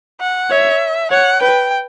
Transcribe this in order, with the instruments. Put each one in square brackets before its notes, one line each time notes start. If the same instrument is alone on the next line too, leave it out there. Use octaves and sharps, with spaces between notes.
[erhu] F#5
[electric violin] C#5 [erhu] E5
[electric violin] C#5 [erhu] F#5
[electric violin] B4 [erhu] G5